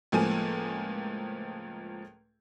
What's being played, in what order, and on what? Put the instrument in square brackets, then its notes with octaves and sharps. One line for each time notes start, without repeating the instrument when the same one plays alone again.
[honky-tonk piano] C#2 A2 F3 A#3 A4 G#5